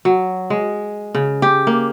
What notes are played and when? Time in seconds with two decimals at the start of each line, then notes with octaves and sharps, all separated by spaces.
0.05 F#3
0.50 G#3
1.15 C#3
1.42 G4
1.67 A#3